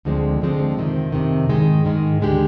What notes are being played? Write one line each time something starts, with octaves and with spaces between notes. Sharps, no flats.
D2 D3 F3 G#3 C4
D2 D3 F3 G#3 C4
F2 C3 D#3
F2 C3 D#3
G#2 D#3 G#3
G#2 D#3 G#3
D2 D3 G#3 D4 G4